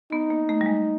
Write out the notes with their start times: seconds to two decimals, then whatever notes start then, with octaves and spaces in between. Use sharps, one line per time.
0.12 B3 D#4
0.30 A#3
0.49 A3
0.61 G3
0.66 G#3